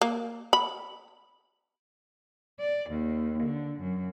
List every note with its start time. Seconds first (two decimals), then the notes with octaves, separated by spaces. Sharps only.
0.01 A#3
0.53 B5
2.59 D5
2.90 D#2
3.43 D3
3.79 F#2